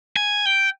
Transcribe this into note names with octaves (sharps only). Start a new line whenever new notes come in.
G#5
G5